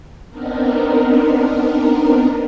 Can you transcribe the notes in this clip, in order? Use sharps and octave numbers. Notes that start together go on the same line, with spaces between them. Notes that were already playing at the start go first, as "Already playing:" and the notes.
B3 C4 D4 D#4 A#4